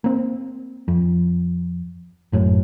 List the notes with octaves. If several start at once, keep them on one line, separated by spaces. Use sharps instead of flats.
A#3 C4
F2
G#1 F#2 A2